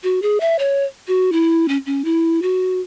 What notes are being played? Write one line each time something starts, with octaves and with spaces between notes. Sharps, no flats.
F#4
G#4
E5
C#5
F#4
E4
C#4
C#4
E4
F#4